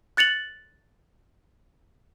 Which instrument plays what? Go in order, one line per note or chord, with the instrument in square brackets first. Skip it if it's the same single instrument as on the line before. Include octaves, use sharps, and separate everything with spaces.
[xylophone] F#6 A6 C#7 F7 F#7